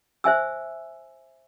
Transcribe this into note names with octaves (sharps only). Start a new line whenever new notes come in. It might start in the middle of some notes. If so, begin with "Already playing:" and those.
C5 E5 G#5 E6